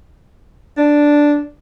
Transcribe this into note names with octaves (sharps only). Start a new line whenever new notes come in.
D4